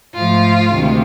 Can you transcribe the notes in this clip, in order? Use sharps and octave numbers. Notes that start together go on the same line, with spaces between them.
G#2 F3 A3 F4
D2 C3 D#3 G#3